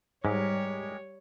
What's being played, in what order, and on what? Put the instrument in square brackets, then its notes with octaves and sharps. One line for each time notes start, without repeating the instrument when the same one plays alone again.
[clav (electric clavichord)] G#2 [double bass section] G3 [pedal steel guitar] G#3 G4 A#4 [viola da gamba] C#5